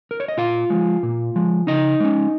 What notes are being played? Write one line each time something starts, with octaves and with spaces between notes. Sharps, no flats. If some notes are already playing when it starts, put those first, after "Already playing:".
A#4
C#5
D#5
A#2 F4 F5
F3 G#3
A#2
F3 G#3
C#3 D#4 D#5
G#3 C#4